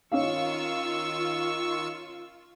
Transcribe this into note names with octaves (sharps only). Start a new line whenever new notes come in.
D#3 C#4 D#4 F4 F5 C#6 E6